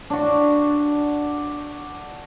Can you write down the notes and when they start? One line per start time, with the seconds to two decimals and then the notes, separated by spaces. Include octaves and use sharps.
0.10 D4 F#4